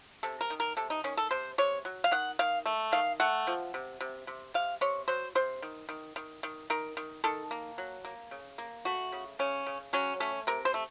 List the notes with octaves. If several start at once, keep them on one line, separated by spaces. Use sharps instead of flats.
C3 A4
A#4
D#3
A#4
C3 A4
D#4
D#3 C#4
A4
C3 C5
C3 C#5
F#3
F5
D#3 F#5
D#3 F5
A3
D#3 F5
A3 F#5
F3
C3
C3
C3
C3 F5
C3 C#5
F#3 C5
C3 C5
D#3
D#3
D#3
D#3
D#3 A#4
D#3
D#3 A4
A#3
F#3
A#3
C#3
A#3
A3 F#4
C#3
C#3 C#4
C#3
F#3 C#4
A3 C#4
C3 A#4
C5
A3